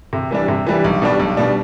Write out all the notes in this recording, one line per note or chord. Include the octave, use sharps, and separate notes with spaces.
C3
E3 G3 D4
C3
E3 G3 D4
B1
B2 G3 D4
B1
B2 G3 D4